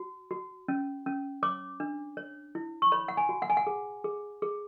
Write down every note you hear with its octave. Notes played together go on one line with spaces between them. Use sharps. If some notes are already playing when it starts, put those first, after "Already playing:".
Already playing: F#4
F#4
C#4
C#4
C#5 D6
D4
C#5
E4
C#6
C#5 B5
F#5
G#5
F#4
F#5
G#5
F#5
G#4
G#4
G#4